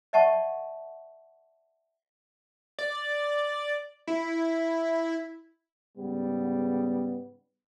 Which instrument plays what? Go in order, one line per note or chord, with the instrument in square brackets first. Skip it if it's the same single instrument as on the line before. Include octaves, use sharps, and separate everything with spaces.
[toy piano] D5 E5 F#5 A5 C#6
[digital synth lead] D5
E4
[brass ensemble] G#2 C#3 G3 B3